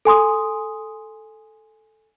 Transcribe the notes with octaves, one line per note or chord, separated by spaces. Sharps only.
A4 G#5 C6 D#6